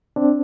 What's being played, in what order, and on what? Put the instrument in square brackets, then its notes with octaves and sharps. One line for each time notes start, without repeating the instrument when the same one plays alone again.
[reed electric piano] C4 D4